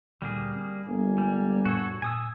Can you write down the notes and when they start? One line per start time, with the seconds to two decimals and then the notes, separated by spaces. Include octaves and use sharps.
0.22 D2 A#2 D3 G3 A#3 G#4
0.56 C4
0.86 G1 A#3 G#5
1.18 G3 G#3
1.65 F2 A2 F#4 A4 C#5
2.02 A#2 G#5 D#6 E6